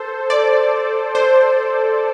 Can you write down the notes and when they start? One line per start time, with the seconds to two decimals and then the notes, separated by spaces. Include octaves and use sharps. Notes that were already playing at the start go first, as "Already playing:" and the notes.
Already playing: A4 C5
0.30 D5
1.15 C5